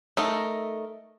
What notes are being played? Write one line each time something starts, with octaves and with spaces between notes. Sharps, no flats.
A3 D#4 A#4